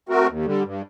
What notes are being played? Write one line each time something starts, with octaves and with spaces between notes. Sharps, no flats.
A3 C4 F#4 A#4
D#2
D3 G3
G2